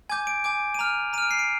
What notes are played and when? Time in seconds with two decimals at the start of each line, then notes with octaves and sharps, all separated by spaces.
0.09 G#5 D6 G6 G#6
0.27 D7
0.44 G#5 D6 G6 D7
0.74 D#7
0.79 A#5 F6 F7
1.13 A#5 D#7
1.18 F6 D7
1.31 C7
1.39 D7